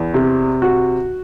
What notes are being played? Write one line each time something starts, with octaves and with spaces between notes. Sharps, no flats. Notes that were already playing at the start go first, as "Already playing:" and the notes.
Already playing: E2
C3
F#4